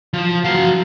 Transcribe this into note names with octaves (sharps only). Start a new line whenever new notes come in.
F3
F#3 F5